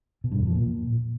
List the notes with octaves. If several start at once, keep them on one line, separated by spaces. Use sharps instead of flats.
B2
G2
E2
F3
A#2